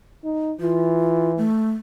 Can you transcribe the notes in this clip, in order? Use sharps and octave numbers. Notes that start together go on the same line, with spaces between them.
D#4
E3 F4
A3